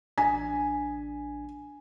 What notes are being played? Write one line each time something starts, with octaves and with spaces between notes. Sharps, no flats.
A1 D4 G#5 B6